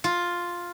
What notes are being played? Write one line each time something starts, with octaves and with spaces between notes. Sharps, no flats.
F4